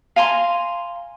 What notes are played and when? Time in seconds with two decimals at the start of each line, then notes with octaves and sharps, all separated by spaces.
0.16 F5 G#5 A#5 C6